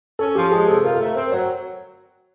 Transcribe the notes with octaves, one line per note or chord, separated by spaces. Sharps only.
C#4 A4
F3 G4
G#3 G#4
C3 A4
F4 A#4
A4
A3
A#4
C4 C5
F#3 C#5